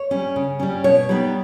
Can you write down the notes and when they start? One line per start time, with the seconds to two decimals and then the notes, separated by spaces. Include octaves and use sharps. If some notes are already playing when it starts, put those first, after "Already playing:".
Already playing: C#5
0.11 G3 C#4
0.36 C#3
0.60 G3 C#4
0.84 B2 C#5
1.09 G3 B3 D#4